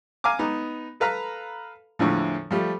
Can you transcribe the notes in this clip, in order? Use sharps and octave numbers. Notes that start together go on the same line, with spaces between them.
F5 G#5 A#5 D6
B3 D#4
A4 B4 F5 A#5 B5
E2 A2 D3 E3 F3
F3 G3 A3